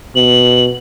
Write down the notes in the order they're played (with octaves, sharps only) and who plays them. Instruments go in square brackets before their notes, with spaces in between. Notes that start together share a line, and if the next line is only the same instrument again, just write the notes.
[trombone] B2 [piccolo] F#7